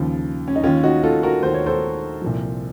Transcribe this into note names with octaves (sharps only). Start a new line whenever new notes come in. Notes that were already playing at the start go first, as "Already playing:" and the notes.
Already playing: D#2 C#3 F3
C#4
D#4
D#2 D#3 C#4 F4
D#4 F#4
F4 A4
F#4 A#4
D#2 D#3 C5
C#5
A4 C5
C2 A#2 F3